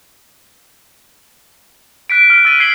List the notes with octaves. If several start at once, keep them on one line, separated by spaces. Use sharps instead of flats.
F#6 B6 D7
F6 F#6
E6 F#6 A6 D#7
F6 G#6 B6 C7 F#7 G7